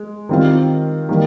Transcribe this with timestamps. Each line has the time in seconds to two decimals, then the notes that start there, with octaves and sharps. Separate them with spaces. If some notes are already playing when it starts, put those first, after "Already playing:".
Already playing: G#3
0.29 D#3 G3 C4 F4
1.09 D#3 G3 A#3